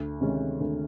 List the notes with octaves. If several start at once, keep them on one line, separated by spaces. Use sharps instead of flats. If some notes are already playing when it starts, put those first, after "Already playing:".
Already playing: D2
C3 D#3 G#3 C#4
D2